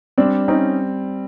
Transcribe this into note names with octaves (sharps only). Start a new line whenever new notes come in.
G3 C4 D4
C4 C#4 D#4